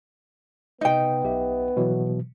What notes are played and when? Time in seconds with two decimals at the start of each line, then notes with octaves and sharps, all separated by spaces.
0.81 C3 B3 D#4 D#5 G5
1.24 B1 G4 E5
1.77 B2 E3 F#3